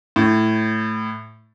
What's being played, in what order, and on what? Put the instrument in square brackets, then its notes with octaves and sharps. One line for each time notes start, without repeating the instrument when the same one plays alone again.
[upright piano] A2